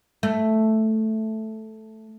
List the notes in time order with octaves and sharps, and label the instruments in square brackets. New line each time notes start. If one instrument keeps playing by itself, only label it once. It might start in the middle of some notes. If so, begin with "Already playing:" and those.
[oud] A3